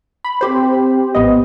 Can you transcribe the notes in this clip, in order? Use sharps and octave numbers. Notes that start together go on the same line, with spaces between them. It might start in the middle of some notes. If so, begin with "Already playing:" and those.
B5
C4 G4 C5
A1 B3 D#5